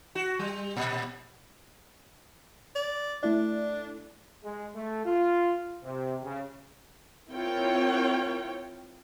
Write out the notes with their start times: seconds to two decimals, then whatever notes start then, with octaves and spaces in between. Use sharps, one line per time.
0.15 F#4
0.39 G3
0.77 A#2
2.75 D5
3.23 A3 D4 E4 D5
4.44 G#3
4.75 A3
5.05 F4
5.84 C3
6.23 C#3
7.30 C4 E4 F4 A#4 C#5 G5